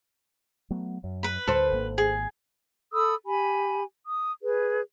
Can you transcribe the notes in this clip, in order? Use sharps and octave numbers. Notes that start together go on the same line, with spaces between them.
F#3 A3 B3
F#2
B4 B5
D2 A4 C5
G#1 A#3
G#4
A4 B5 D#6 E6
G4 G#5 B5
D#6
G#4 B4